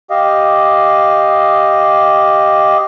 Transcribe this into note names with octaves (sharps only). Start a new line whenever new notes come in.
G4 D#5 F5